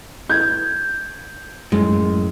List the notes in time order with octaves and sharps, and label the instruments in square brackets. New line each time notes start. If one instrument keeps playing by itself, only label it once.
[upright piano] G6 G#6
[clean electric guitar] F#2 A2 [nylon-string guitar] G#3